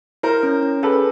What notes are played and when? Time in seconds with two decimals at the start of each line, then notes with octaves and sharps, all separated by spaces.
0.23 E4 A#4 C5
0.43 C#4
0.63 C#4
0.83 G#4 A4 B4